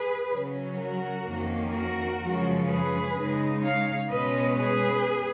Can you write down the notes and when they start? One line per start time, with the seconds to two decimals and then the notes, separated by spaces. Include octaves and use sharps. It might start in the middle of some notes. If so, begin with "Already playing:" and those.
Already playing: G#4 B4
0.30 C#3 F#3 C#4
0.77 F#4 A#4
1.25 F2 D#3 A#3 C#4
1.73 F#4 A#4
2.20 F#2 C#3 F3 G#3 C#4
2.67 G#4 B4
3.14 C#3 G#3 D#4
3.62 C#5 F5
4.09 B2 G#3 C#4 B4 D#5
4.56 G#4 B4